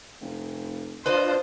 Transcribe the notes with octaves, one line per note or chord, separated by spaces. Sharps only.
F1
D4 F4 B4 C5 D#5